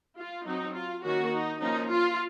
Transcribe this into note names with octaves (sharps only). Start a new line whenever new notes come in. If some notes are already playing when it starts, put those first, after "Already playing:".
F4
F#3 C4 D#4
F4
D#3 A#3 C#4 F#4
D#4
F3 A#3 C#4 D#4
F4